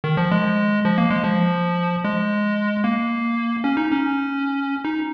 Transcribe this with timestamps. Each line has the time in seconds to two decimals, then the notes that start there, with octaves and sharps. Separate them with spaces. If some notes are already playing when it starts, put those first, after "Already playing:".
0.04 D#3
0.17 F3
0.32 G#3
0.85 F3
0.98 A#3
1.10 G#3
1.24 F3
2.05 G#3
2.84 A#3
3.64 C#4
3.77 D#4
3.91 C#4
4.85 D#4